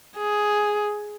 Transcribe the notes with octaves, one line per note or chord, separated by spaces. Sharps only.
G#4